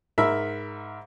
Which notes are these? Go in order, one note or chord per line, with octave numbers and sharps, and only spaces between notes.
G#2 A#4 E5 B5 E6